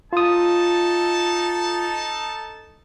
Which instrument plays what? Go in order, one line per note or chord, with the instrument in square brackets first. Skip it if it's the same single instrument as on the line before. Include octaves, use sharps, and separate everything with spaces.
[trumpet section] D#4 A4 A5 [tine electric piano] F4 D#6